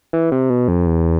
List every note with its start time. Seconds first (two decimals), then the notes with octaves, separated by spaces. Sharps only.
0.13 E3
0.32 C3
0.50 B2
0.68 F2
0.86 E2